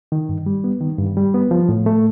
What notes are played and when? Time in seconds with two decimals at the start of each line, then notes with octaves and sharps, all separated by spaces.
0.12 D#3
0.29 G2
0.46 G3
0.64 B3
0.81 D#3
0.98 G2
1.17 G3
1.34 B3
1.51 F3
1.69 A2
1.86 A3